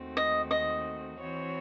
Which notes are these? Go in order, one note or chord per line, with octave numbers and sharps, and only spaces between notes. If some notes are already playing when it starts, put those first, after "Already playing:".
Already playing: D#2 D#3 A3 C4 F#4
D#5
D#5
E3 C4 F#4 C#5